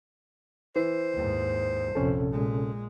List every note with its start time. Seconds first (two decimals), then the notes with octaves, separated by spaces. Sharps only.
0.76 E3 C5
1.14 D#2 G#2
1.95 A#1 F2 C3 C#4 A4
2.32 A#2 G#3